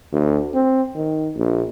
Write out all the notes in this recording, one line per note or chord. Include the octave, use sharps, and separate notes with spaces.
D2
C4
D#3
A#1